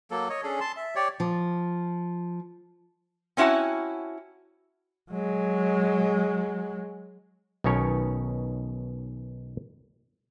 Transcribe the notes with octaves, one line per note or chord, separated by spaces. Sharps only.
F#3 A#3 A4
C#5 D#5
C#4 D4 G#4 A4
A5 C6
E5
G4 C#5 D5
F3
C4 C#4 E4 F#4 F#5 A5
F#3 G#3
B1 B2 D#3 C#4 C#5